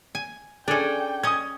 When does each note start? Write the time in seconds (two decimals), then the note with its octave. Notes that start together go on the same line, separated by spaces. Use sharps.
0.15 G#5
0.68 C#4 D4 G#4 A4 D5 G5
1.23 C#4 D#5 D#6 G#6